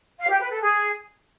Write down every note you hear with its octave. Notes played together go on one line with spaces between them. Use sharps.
F5
G4
B4
A4
G#4